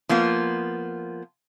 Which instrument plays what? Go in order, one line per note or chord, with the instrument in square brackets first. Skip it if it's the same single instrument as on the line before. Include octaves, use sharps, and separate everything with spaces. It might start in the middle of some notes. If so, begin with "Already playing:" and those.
[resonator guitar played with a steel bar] F3 A#3 B3 F4